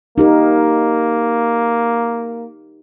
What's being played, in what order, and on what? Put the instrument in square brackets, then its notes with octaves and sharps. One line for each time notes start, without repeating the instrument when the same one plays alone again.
[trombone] A#3 [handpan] D#4 G4 A#4